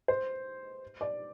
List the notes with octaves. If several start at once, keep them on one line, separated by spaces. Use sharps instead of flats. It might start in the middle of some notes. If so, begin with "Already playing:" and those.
C5
D5